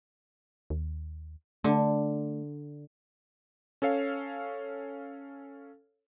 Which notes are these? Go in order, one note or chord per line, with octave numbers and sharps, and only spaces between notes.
D#2
D3 A3
C#4 A4 C#5 F5